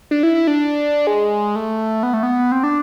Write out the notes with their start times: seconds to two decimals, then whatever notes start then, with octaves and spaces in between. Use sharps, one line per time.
0.11 D4
0.23 E4
0.35 E4
0.47 D4
1.07 G#3
1.56 A3
2.03 B3
2.14 A3
2.23 B3
2.52 C4
2.63 D4